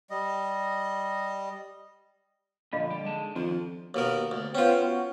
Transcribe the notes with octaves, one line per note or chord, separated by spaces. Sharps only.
G3 D#5
A#2 D3 F3 D#5 F5 B5
G3 D5
G#2 G#3 A5
F2 D#3 F3 D4
D#2 B2 A#4
D2
B3 C#4 F4 C5 G5
F#4